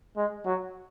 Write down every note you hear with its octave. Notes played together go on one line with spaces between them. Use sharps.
G#3
F#3